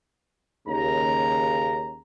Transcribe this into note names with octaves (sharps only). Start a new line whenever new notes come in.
D#2 C#3 A#5